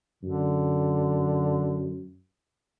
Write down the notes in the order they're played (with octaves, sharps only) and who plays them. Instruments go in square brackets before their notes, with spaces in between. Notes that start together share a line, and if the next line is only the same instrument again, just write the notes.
[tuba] F#2 [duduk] D3